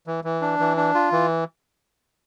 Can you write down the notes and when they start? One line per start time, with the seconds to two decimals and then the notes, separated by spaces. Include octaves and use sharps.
0.07 E3
0.24 E3
0.42 D4
0.59 E3
0.77 D4
0.95 F4
1.12 E3